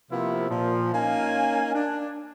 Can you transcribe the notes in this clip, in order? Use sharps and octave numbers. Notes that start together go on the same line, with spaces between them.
C3 F3 A#3 B3 E4 F4
A#2 F3
A#3 C#4 D#4 F5 G#5
D4